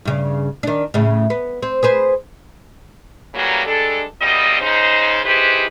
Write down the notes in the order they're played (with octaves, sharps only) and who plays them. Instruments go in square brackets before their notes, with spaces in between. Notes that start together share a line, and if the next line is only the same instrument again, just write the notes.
[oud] G2 C#3
D#3 D4
A2 C#3
B3
C4
G#4 B4 C5
[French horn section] C#3 E3 F#3 G3 A#3
G2 G#3 D4 A4
E2 A#2 G3 C4 D#5
C#3 D#4 C5
D#4 E4 G4 G#4 B4 C5